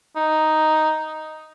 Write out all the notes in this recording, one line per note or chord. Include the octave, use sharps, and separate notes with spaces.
D#4